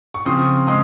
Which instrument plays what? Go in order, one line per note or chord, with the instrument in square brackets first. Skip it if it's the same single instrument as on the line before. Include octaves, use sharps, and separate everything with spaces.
[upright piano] C#6
C#3 F3 C4 C6 D#6
C#3 G#3 C6 D#6